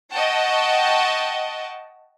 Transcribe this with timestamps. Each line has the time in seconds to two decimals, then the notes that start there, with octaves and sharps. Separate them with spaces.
0.12 D#5 F#5 G5 A5 C#6